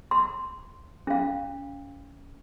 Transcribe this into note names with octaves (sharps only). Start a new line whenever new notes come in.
C6
C#4 F5